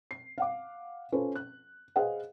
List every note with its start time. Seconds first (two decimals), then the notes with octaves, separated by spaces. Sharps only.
0.11 C7
0.38 F5 F#5 D6
1.12 C#4 F4 A4 B4 C5
1.35 F#6
1.96 G#4 B4 C5 D#5 F5 F#5